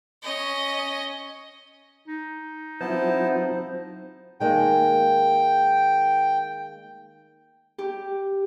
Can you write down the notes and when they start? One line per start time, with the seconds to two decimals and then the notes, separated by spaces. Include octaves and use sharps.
0.23 C#4 D#5
2.07 D#4
2.81 F#3 B3 C4 E4 F4 C5 A5
4.40 D#3 G#3 A#3 G5
7.78 G4